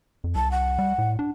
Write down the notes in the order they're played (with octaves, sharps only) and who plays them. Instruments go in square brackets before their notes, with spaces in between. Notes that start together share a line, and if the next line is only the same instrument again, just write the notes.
[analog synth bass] F2
[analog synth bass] C2 [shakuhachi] A5
[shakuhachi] F#5
[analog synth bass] G3
A2
D4